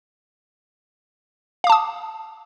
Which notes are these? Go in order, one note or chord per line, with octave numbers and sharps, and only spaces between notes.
F5 A5 D6 D#6